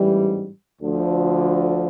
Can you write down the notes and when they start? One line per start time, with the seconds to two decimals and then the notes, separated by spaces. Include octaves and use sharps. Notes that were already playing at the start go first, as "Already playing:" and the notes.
Already playing: A1 G#2 E3 G3
0.82 D2 D3 F3